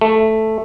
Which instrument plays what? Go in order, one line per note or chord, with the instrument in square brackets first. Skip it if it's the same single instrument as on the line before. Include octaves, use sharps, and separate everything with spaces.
[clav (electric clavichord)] A3